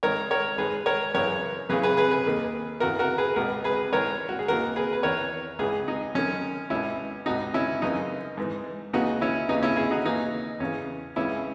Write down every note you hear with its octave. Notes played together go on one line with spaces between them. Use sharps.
G#2 D#3 A#4 C#5
A#4 C#5
G#2 D#3 G#4 B4
A#4 C#5
F#2 C#3 E3 A#4 C#5
F#2 C#3 E3 G#4 B4
G#4 B4
G#4 B4
G#4 B4
D#2 D#3
E2 C#3 E3 F#4 A#4
F#4 A#4
G#4 B4
C#2 B2 F#4 A#4
G#4 B4
G#2 E3 A#4 C#5
F#4
G#4
D#2 C#3 E3 F#4 A#4
G#4 B4
B4
E2 D#3 A#4 C#5
C#2 C#3 E3 G#4 B4
D#4
F#2 D#3 C#4
C#2 B2 C#4 E4
C#2 B2 D#4 F#4
C#4 E4
F#2 C#3 E3 D#4
G#2 E3
D#2 C#3 E3 D#4 F#4
C#4 E4
D#2 C#3 E3 D#4
C#4 E4
E4 G#4
D#4 F#4
D#2 C#3 E3 D#4
E2 C#3 E3 C#4
C#2 C#3 E3 C#4 E4